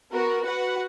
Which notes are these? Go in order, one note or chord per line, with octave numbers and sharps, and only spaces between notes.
B3 F#4 A#4
F#4 B4 F#5